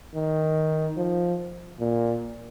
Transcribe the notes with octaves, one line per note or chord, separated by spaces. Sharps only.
D#3
F3
A#2